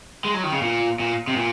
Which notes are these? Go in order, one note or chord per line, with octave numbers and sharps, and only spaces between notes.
G#3
F#3
D#3
C#3
A#2
A#2
C3
A#2